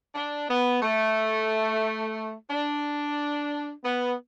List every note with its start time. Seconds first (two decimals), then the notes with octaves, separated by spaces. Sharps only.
0.15 D4
0.49 B3
0.82 A3
2.50 D4
3.84 B3